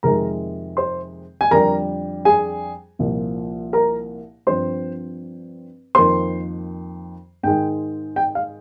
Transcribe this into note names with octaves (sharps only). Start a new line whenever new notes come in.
F2 C3 D#3 G#3 A#4 A#5
C5 C6
G#5
F2 D3 G3 A#4 A#5
G#4 G#5
C2 A#2 F3 A#3
A#4 A#5
G2 F3 C4 C5 C6
F2 D#3 A#3 C5 C6
G#2 D#3 G#3 G5
G5
F5